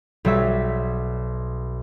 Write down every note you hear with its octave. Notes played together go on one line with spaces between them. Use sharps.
B1 G3 C#5 E5